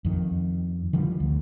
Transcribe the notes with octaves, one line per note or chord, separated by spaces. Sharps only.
F2 D#3
D3 E3 F3 G3
D2